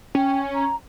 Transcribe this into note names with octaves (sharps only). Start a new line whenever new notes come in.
C#4 G5
A#5